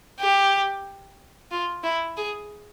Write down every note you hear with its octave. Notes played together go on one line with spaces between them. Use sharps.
G4
F4
E4
G#4